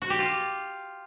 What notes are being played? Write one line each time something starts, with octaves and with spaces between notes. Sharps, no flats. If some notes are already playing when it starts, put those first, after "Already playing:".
F#4
G4
F4